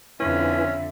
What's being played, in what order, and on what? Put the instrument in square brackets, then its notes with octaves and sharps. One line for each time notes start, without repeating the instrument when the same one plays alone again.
[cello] F2 D3 [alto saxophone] C#4 [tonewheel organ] E4 B4 G#5 [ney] E5